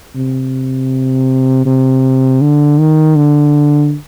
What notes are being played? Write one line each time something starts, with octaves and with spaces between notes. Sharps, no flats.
C3
C3
D3
D#3
D3